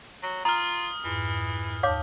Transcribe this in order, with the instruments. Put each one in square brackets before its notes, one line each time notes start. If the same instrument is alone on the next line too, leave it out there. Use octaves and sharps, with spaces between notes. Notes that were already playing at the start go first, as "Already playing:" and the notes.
[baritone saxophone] F#3
[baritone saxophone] F4 [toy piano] A#5 [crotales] D#6 F6
[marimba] F2 G#2 [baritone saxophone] E3
[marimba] D#2 A5 [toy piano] C#5 F5 D6